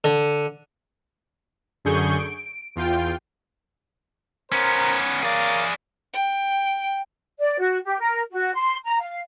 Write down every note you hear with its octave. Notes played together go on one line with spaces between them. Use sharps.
D3
F#2 D3 G#4 C#6 G6
D7
E2 F4 G5
B3 C#4 A#4 C5 A#5
G#4 A#4 C#5 D5 F5
G5
D5
F#4
G4
A#4
F#4
C6
A#5
F5